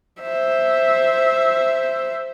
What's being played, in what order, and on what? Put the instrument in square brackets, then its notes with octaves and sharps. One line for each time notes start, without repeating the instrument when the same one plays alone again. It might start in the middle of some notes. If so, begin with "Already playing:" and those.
[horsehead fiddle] C5 E5